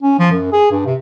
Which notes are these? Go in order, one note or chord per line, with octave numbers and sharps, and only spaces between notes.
C#4
F3
F#2
G#4
G2
C3